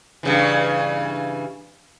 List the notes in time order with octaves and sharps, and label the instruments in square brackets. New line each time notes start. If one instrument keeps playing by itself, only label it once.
[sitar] G2 C#3 E3